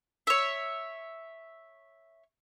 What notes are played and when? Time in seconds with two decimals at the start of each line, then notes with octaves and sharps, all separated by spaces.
0.27 C#5 E5